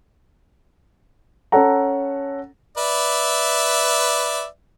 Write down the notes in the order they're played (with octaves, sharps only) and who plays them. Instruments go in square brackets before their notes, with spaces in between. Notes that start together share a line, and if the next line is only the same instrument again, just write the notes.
[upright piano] C#4 A4 F#5 A#5
[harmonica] B4 D5 E5